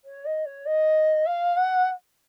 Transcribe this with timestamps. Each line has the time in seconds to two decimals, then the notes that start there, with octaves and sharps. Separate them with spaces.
0.05 C#5
0.26 D#5
0.46 C#5
0.66 D#5
1.26 F5
1.56 F#5